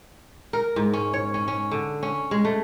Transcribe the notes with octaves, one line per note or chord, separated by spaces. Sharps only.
A#4
G#2
C#4
C#5
C#4
C#4
D3
C#4
G#3
A3